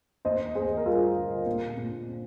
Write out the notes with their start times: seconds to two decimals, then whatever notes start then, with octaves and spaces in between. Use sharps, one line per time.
0.25 D#2 C5 D#5
0.55 D#2 G#4 C5
0.77 A#4
0.86 G3 F4 G#4
1.16 D3
1.46 A#2
1.77 A#2
2.08 C4